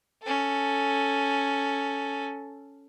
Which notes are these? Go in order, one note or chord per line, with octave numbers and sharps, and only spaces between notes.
C#4 A4